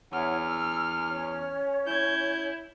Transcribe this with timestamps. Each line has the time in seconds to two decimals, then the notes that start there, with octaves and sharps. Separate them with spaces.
0.13 E2 E4 C#5 F#5 F6
0.45 E6
1.09 C#4 C#5
1.87 E4 G6 G#6